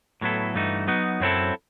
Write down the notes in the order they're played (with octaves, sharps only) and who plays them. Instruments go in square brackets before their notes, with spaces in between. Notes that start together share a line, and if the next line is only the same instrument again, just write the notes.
[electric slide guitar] A2 F#3 B3 E4 A4
G2 E3 A3 D#4 F#4
F#3 B3 D#4 F#4
F#2 F#3 C4 E4 A4